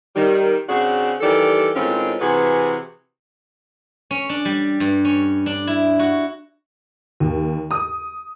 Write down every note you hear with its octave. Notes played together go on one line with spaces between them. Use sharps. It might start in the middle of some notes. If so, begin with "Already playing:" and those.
D#3 G3
C#3 C4 D4 F#4 G#4
D#3 E3 G3 G4 A4 D5
A2 D#3 G#3 C4 C#4 F4
C3 E3 F#4 G#4 B4
C#4
D4
G3
G2
C#4
D4
E4
F#4
D#2
D#6